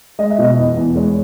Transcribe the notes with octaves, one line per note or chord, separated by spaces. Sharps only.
G#3 D#5
E5
B2 D#5
E2
E2
G#3 C#5